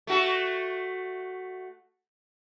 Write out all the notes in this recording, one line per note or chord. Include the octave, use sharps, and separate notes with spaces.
A3 F#4 A4